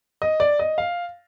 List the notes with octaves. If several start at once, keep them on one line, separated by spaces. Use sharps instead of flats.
D#5
D5
D#5
F5